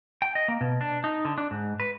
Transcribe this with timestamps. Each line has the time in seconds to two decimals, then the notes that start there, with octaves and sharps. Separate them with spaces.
0.22 G5
0.35 D#5
0.48 A#3
0.61 B2
0.81 D4
1.04 D#4
1.25 D3
1.38 D4
1.51 G#2
1.80 B4